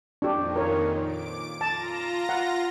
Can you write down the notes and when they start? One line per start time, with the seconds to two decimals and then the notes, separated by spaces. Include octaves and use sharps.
0.22 F2 A#2 D#3 D4 G4
0.56 A#4 C#5
1.02 D6 D7
1.61 F4 A5 A#5 A#6
2.29 F#5